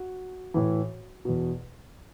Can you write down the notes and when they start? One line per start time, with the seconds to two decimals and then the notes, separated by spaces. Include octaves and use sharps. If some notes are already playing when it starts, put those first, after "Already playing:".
Already playing: F#4
0.54 A2 E3
1.25 E2 B2